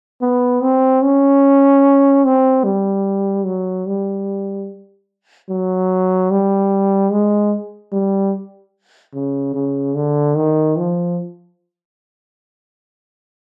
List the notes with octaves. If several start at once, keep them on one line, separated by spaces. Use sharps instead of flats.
B3
C4
C#4
C4
G3
F#3
G3
F#3
G3
G#3
G3
C#3
C#3
D3
D#3
F3